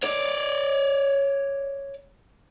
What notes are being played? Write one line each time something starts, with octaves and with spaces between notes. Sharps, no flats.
C#5 D5